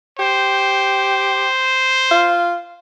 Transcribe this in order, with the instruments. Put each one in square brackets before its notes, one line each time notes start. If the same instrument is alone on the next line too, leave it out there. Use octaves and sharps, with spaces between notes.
[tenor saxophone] G4 [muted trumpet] C5
[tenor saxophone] F4